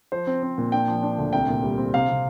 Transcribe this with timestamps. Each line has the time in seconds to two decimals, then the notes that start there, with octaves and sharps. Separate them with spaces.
0.12 F3 C5
0.27 C4
0.43 C4
0.58 A#2
0.72 D4 G5
0.88 F3
1.03 D4
1.18 D2
1.33 C2 G5
1.48 A#2
1.63 G3
1.78 C4
1.94 C3 F5
2.09 C3